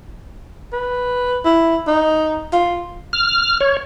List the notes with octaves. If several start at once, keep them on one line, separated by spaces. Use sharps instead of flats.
B4
E4
D#4
F4
F6
C#5